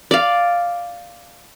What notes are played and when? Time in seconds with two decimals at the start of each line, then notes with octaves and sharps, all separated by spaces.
0.11 D5 F5